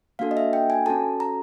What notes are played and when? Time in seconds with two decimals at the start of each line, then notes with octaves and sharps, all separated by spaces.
0.19 A#3 D4 F#4 A4 F5
0.31 D#5
0.37 E5
0.53 G5
0.70 G#5
0.86 C#4 F#4 A4 A5
1.20 A#5